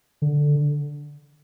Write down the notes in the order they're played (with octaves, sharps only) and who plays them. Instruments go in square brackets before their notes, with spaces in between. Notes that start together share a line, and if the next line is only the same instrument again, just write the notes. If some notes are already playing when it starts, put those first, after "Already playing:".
[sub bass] D3